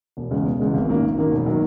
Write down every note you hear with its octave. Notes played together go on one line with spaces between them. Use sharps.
E1
E2 C#3 G#3
E1
E2 C#3 G#3
G#1
F#2 D#3 A#3
G#1
F#2 D#3 A#3
E1
D#3 F#3